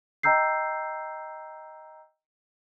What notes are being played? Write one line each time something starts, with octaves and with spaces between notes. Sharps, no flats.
D#5 G5 A#5 E6 G6 C7